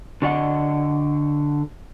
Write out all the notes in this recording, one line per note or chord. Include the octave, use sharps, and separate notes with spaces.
D3 F#4 D5 D#5 F#5